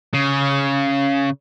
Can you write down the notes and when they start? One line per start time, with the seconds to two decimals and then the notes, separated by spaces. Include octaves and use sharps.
0.14 C#3